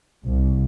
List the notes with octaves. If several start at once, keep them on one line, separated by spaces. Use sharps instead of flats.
C2